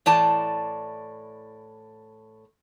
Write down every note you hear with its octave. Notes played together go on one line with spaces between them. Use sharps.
A2 E3 D5 A5